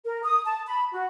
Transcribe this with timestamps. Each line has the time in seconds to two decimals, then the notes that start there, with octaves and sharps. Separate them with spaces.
0.05 A#4
0.24 D#6
0.46 A5
0.67 B5
0.92 F#4